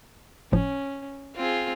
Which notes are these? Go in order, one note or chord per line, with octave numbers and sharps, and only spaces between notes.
G1 A2 F3 C#4
C4 F4 G#4